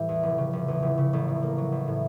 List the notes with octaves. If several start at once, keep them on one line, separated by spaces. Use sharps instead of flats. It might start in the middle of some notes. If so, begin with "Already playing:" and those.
Already playing: A2 E3 G3
E2
F1
C#3
F1
E2
F1
C#3
A1
A2
A#3
F#3
A1
A2